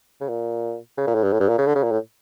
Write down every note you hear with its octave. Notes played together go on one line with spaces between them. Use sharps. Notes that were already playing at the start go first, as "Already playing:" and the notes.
C#3
A#2
C#3
A#2
A2
G2
A2
G2
A#2
C#3
D3
C#3
A#2
A2